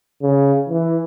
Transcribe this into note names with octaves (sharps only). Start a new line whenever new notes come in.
C#3
E3